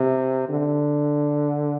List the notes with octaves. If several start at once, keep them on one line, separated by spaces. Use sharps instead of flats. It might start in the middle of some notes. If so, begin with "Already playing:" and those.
Already playing: C3
D3